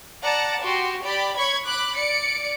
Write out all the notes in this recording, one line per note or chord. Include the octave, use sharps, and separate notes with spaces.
D5 F#5 A5 A#5
F#4 G4 C6
G4 D5 B5
C#5 B5 C#6 G#6
B5 D6 F#6
D5 C#7 D7